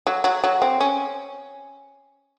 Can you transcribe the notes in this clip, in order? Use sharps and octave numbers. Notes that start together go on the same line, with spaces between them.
F#3
F#3
F#3
C4
C#4